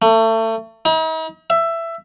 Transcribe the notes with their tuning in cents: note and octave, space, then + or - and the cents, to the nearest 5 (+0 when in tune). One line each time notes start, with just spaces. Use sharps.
A3 +30
D#4 +45
E5 +15